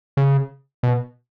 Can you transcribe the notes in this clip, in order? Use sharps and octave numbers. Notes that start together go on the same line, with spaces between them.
C#3
B2